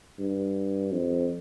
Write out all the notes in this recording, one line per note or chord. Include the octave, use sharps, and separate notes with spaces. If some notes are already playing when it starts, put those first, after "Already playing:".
G2
F2